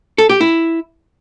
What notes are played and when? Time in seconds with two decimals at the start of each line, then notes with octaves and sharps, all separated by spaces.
0.18 A4
0.29 G4
0.41 E4